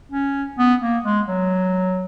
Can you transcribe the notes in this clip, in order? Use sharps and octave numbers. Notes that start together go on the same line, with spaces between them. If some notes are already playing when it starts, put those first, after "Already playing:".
C#4
B3
A#3
G#3
F#3